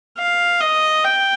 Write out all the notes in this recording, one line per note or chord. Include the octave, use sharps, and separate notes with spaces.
F5
D#5
G5